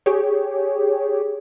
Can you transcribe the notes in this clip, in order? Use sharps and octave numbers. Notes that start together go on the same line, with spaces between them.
G4 G#4 C#5